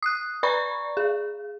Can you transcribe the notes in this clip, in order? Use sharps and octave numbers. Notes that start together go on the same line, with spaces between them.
D#6 F#6
B4 D5 A#5 B5 C#6
G#4